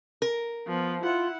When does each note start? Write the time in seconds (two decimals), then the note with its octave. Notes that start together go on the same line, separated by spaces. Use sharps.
0.22 A#4
0.67 F3 B3
1.02 E4 F4 F#5